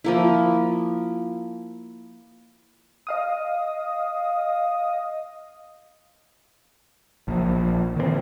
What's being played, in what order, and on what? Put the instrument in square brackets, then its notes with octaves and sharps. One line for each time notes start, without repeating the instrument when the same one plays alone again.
[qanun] F3 A#3 E4
[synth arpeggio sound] D#5 F5 D#6
[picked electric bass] A#1
D#3 E3 G3 C4